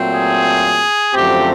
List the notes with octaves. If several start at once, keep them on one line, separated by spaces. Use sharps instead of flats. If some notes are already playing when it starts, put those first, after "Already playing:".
Already playing: A#2 F#3 A3 C4
G#4
F#2 D3 F3 A3 C4 G4